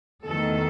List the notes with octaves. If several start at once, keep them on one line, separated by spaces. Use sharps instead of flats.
E2 D#3 A3 A4